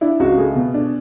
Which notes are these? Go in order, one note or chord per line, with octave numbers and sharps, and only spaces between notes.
D4 E4
C#2 F#4
A3 G#4
B2
D4